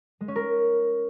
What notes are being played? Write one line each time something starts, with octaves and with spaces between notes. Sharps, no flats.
G#3
C#4
A#4